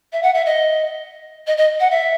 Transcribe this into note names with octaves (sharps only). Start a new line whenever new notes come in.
E5
F#5
E5
D#5
D#5
D#5
F#5
E5